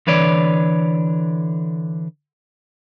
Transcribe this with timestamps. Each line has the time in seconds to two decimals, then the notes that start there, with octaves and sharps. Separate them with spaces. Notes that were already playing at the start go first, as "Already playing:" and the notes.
0.07 D3 E3 B4 C#5 D5